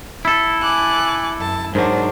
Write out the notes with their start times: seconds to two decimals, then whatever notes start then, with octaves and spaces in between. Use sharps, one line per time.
0.25 E4 A4
0.63 G#5 D6 F#6
1.38 F#2 A5
1.75 G#2 F#3 D4 A#4 C5